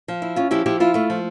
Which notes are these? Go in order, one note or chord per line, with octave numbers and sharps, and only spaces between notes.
F3
E4
C#4 F4
F3 E4 G4
F3 E4 G4
E4 F4
A3 F4
F3